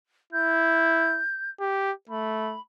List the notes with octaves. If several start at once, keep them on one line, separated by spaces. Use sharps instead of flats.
E4 G6
G4
A3 B5